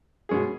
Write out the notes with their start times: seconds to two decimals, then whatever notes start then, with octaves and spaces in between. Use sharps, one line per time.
0.29 B2 G#3 C#4 G#4